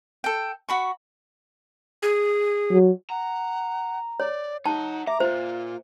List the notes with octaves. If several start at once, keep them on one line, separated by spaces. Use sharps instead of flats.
A4 G5
F#4 B5 C#6
G#4
F#3
F#5 A#5
C#5 D5
D#4 C#5 F#5 A5
E5 A#5 D6
A#2 F4 C5